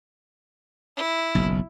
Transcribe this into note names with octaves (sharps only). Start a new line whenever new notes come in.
E4
F#1 B1